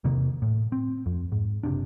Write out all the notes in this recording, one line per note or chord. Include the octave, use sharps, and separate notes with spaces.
E2 C3 D#3 A#3
A2
C4
F2
G#2
F#1 C3 D4